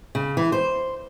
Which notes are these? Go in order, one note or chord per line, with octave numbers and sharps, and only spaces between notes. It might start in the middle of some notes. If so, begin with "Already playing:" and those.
C#3
E3
C5